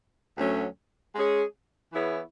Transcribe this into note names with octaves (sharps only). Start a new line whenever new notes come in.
D2 D3 F#3 A3 C#4
G#3 C#4 G#4 C#5
E3 B3 E4 G#4 C#5